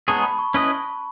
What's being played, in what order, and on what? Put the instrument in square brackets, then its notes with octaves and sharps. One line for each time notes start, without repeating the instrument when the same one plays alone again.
[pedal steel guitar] G#3 B3 D#4 G#4 C#5 [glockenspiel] A5
[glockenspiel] B5
C#6
[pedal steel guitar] C#4 E4 B4 D#5